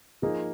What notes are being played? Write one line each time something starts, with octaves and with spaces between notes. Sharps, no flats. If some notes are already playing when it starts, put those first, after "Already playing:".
F3 A#3 D#4 G#4